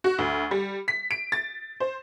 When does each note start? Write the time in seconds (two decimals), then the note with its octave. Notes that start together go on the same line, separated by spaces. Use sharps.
0.04 F#4
0.19 D2
0.51 G3
0.88 B6
1.11 D7
1.32 A6
1.80 C5